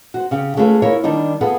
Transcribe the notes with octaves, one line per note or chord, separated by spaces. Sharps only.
F#4 C5
C#3 C#4 G4
G#3 A3 C#4 F4 G#4 B4
E4 F4 A#4 C#5
D#3 G3 D4 D#4
B3 F4 G#4 A4 B4